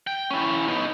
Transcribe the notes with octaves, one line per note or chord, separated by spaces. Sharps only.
G5
C#4 E4
B3 D#4